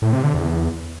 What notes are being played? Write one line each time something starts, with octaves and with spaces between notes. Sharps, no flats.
A2
C3
D3
E2